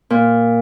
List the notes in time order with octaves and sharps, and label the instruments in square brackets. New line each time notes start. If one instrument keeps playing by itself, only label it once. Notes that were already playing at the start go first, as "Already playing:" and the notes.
[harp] A#2